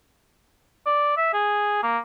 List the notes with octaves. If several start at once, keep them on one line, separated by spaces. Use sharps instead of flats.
D5
E5
G#4
A#3